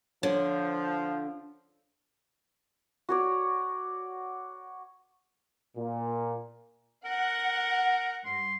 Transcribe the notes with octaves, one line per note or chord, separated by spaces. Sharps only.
D3 F3 C#5
F#4 C#5 D5
A#2
A#4 F#5
G2 C6